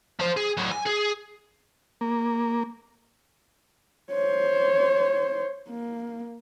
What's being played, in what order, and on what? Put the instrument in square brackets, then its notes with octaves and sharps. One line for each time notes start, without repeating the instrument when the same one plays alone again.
[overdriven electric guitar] F3 C5
G#4
A2 F#3
G#5
G#4
[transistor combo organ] A#3
[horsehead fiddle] C5 C#5
A#3